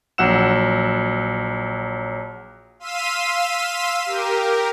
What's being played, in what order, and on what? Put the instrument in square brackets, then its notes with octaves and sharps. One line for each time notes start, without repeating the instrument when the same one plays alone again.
[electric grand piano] A#1 F#3 F#5 E6 E7
[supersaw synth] F5 C6 E6 B6 D#7
G4 A#4